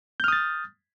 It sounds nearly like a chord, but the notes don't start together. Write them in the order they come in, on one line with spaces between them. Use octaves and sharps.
G6 F6 D#6 A6